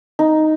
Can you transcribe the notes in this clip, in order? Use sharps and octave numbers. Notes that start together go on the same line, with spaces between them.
D#4